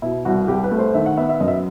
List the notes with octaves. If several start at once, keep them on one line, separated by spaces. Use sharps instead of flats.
B2 E4
C2 F#4
C2 G4
B4
A3
C5
D#3 E5
F#5
B3 E5
E5
F#2 D#5
E5